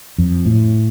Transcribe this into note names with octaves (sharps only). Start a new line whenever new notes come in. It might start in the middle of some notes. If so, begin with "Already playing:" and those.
F2
A2